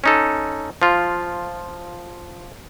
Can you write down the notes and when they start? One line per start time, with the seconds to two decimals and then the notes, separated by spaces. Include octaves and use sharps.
0.04 C#4 D#4 A4
0.82 F3 F4